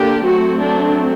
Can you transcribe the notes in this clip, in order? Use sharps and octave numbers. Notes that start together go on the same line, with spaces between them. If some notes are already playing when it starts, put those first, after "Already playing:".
Already playing: D3 A#3 D4 G4
F#3 A3 C4 F#4
D4